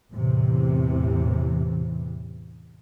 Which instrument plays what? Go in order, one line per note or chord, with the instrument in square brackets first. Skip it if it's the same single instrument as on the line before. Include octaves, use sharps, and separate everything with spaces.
[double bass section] E2 A2 C3 E3